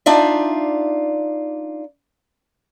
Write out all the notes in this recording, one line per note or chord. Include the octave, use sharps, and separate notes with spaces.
D4 D#4 F4 D5 E5